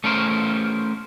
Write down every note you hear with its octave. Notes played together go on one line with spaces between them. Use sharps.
A3 C#4 A#4 C5